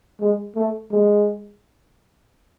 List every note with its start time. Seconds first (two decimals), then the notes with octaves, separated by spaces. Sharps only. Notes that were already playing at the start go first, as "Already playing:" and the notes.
0.20 G#3
0.55 A3
0.91 G#3